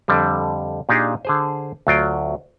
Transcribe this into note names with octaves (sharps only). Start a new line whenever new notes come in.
F2 D3 G3
A#2 D4 D#4 G4 G#4 F5
D3 G#4 C5
D2 F#3 F4 G5